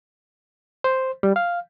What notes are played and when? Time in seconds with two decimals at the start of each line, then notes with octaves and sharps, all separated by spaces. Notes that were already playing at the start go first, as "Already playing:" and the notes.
0.84 C5
1.23 G3
1.36 F5